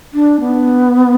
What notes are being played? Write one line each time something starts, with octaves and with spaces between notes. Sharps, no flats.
D4
B3